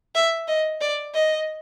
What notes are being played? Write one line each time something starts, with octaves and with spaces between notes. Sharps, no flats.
E5
D#5
D5
D#5